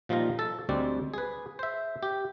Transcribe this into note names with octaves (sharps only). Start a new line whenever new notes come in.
A#2 F3 G3 D#4 F4 A#5
A4 A5
D2 G3 G#3 C4 D5
G#4 B4
C5 E5
G4